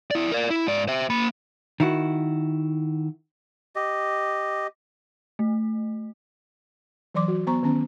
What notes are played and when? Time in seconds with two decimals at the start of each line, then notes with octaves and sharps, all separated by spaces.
0.11 E4 D5
0.32 A#4 D5
0.50 E4
0.67 G#2 D5
0.88 C5 E5
1.10 A#3 B5
1.80 D#3 E4 F#4
3.76 G4 D#5
5.39 A3
7.15 E3 F#3 D5 C6 D6
7.28 F#4
7.47 B3 C5 A#5 C#6
7.63 D#3 B3 C#4 A#5